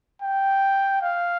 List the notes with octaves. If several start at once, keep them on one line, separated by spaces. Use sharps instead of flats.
G5
F5